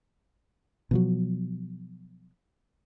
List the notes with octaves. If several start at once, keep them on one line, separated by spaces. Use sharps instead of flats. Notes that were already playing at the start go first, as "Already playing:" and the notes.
B2 F3 F#3